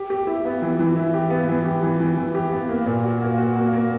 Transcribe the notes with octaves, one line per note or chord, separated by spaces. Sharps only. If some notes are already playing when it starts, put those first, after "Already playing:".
Already playing: G4
G4
E4
B3
E3
E3
E4
G4
B3
E3
G4
E3
E3
E3
G4
B3
A#3
A#2
F#4
A#3
F#4
A#3
A#3